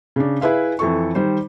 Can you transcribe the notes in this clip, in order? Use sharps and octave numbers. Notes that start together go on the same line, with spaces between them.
C#3 D4
E4 G#4 B4 E5 F5
F2 E3 A4 C#6
D#3 G3 C5